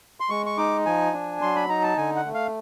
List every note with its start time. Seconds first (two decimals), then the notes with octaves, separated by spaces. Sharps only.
0.20 C6
0.30 G#3 C#6
0.46 C#6
0.58 D#4 D6
0.86 F3 G#5
1.13 D4
1.42 F#3 C6
1.56 B5
1.69 D#4 A#5
1.83 A5
1.97 D3 G#5
2.16 F#5
2.26 A3
2.34 F5